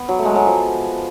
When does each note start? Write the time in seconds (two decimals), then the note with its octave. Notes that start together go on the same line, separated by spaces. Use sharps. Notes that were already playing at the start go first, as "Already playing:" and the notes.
Already playing: B3
0.09 F#3
0.19 A3
0.25 G#3
0.36 F#3
0.47 F3